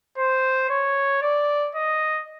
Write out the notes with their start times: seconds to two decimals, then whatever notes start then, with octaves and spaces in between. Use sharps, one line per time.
0.17 C5
0.69 C#5
1.22 D5
1.75 D#5